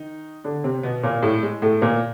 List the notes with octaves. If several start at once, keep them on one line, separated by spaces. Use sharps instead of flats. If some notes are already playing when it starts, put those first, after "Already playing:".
Already playing: D#3 D#4
D3 D4
C3 C4
B2 B3
A#2 A#3
A2 A3
G#3
A2 A3
A#2 A#3